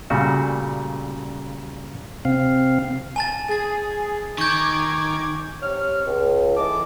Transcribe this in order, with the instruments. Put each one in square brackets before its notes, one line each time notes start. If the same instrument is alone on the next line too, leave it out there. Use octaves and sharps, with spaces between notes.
[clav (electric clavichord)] A#2 C#3 G3 A3 F#4
[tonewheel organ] C3 C4 F5
[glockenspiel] G#5 A5 A6
[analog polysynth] G#4 [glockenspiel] G#5 A6
[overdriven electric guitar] D#3 [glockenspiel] C#6 G6 [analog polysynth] D6 G#6
[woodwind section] C3 C#5 F6
C#2
A2 E3 D#5 A5 D6